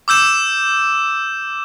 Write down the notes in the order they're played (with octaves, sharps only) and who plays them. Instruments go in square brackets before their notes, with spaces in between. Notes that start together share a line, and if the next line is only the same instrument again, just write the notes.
[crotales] D6 E6 G6 E7